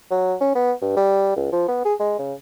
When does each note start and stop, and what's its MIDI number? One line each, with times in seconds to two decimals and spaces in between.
0.11 0.35 54
0.41 0.52 61
0.55 0.72 59
0.82 0.92 43
0.97 1.32 55
1.37 1.52 37
1.53 1.68 53
1.68 1.80 59
1.85 1.94 68
2.00 2.15 56
2.19 2.34 49